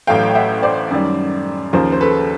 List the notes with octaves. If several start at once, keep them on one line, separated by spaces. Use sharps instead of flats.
A1 A2 F#3 A3 F5 G5
E5 F#5
C5 D5
F#2 D#3 G3
D#2 C#3 F3 A#4 C5
C5
A4 B4